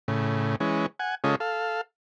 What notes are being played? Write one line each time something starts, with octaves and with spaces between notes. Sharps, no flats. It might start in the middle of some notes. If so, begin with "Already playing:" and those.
A2 C#3
E3 G#3 C#4
F#5 G#5
C#3 G#3 C#4 F4 A4 D#5
A4 F5